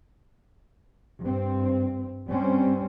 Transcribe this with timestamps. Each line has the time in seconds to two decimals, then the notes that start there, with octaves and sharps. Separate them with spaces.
1.21 G2 C4
2.29 G2 G3 C4 C#4